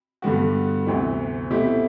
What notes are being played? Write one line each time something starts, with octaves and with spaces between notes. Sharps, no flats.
G2 D3 G3 B3 F#4
D2 C3 E3 B3
B2 A3 C4 E4 G4